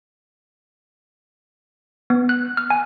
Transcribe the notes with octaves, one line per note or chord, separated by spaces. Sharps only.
B3
F#6
F6
G#5